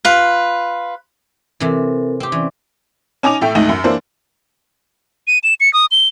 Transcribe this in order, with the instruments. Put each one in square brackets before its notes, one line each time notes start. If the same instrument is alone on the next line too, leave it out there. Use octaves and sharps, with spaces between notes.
[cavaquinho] F4 B4
[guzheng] C3 E3 [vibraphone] C4 A4 A#4
[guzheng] C4 G4
[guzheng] E3 [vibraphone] C4 C#4 D5
[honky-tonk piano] C#4 D#4 G#5 D6 F7
A2 A3 G5
D2 G#2 A3 D#4
F#2
E3 A#3 D4 C5
[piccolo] D#7
E7
C#7
D#6
G7